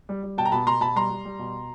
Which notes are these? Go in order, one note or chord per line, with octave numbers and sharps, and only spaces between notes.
G3
G3
B2 G5 A5
A#5
B2 A5 B5
B2 A#5 C6
B2 A5 B5
G3 A#5 C6
G3
G3
B2